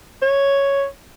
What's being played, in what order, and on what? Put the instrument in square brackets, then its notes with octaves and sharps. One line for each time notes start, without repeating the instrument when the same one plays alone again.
[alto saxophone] C#5